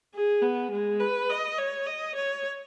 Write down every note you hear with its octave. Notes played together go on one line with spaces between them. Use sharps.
G#4
B3
G#3
B4
D#5
C#5
D#5
C#5